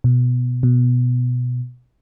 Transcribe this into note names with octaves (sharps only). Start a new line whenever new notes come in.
B2
B2